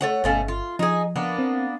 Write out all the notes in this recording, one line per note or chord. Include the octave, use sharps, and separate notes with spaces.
A3 C#5 F#5
G1 B2 A3 C#4 F5
F4
F3 D#4 G#4
A#3 B3 D4
C4